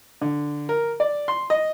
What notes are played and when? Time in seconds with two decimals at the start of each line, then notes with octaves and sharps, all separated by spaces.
0.21 D3
0.69 A#4
1.00 D5
1.28 C6
1.50 D#5